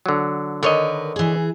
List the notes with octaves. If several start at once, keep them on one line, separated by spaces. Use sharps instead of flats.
D3 F#3
D3 D#3 A#4 B4 C#5 D#5
E3 G#4